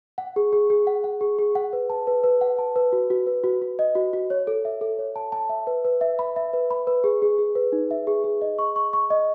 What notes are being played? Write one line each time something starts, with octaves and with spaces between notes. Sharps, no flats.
F#5
G#4
G#4
G#4
F#5
F#5
G#4
G#4
F#5
B4
A5
B4
B4
F#5
A5
B4
F#4
F#4
B4
F#4
F#4
D#5
F#4
F#4
C#5
A4
E5
A4
C#5
A5
A5
E5
B4
B4
E5
B5
E5
B4
B5
B4
G#4
G#4
G#4
B4
D#4
E5
G#4
G#4
D#5
C#6
C#6
C#6
D#5